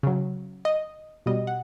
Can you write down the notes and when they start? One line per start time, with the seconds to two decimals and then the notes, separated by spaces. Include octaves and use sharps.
0.03 C#3 F#3
0.65 D#5
1.26 B2 G3 D#5
1.47 F#5